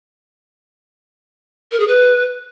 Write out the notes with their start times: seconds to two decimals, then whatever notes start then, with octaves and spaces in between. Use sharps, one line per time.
1.72 A#4
1.80 G#4
1.88 B4